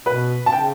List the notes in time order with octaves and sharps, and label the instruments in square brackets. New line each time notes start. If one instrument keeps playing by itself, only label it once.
[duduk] B2 [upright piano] B4
[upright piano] A5
[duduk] C#3 [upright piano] G5